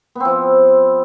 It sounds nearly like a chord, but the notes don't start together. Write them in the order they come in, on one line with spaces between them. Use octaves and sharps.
B3 C4 F3